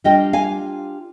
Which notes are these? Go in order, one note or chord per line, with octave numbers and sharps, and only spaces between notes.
G3 D4 F4 D#5 G5
F5 G#5